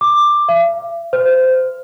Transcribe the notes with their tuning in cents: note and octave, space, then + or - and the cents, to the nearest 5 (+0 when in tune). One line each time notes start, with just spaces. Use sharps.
D6 +10
E5 +45
C5 -20